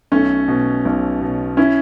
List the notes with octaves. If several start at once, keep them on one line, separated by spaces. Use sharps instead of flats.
B1 A3 C#4
B2
B1
B2
C#4 E4